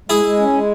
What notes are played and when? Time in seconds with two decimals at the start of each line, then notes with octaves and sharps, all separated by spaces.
0.09 G#3 E4 G#4
0.24 G#3
0.39 C#4
0.53 G#3